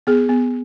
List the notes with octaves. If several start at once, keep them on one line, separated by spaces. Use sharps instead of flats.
B3 G#4
B3